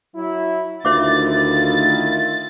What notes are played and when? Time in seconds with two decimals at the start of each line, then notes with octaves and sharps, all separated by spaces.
0.15 F#3 E4
0.85 D2 D#3 E4 F4 C5 E5 D6 A6